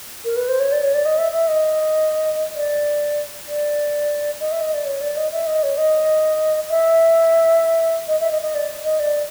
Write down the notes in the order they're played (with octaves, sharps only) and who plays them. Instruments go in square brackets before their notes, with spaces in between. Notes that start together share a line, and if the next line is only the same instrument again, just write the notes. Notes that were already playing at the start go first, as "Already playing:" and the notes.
[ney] A#4
B4
C5
C#5
D5
C#5
D5
D#5
E5
E5
D#5
D5
D5
D#5
E5
D#5
D5
C#5
D5
D#5
E5
D#5
C#5
D#5
E5
D#5
E5
D#5
D#5
D5
D#5
D5